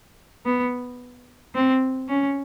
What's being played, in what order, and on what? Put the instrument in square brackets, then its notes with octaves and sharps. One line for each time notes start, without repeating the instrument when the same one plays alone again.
[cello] B3
C4
C#4